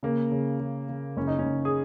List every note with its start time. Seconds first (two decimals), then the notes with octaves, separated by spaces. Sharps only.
0.03 C#3 A#3
0.32 C#3
0.60 C#3
0.89 C#3
1.17 F#1 C#4
1.27 D#4
1.39 C#4
1.45 F#1
1.65 G#4